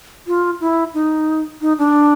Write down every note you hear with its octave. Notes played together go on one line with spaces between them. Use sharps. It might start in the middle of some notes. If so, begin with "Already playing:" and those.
F4
E4
D#4
D#4
D4